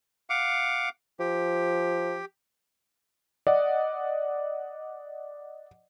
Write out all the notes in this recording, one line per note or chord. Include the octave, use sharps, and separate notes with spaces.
F5 F#5 D6
F3 G4
D5 D#5 F#5